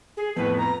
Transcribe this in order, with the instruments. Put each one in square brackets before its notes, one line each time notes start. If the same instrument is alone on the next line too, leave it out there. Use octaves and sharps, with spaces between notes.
[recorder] G#4
[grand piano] F2 A2 B3 [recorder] B4
[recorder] A#5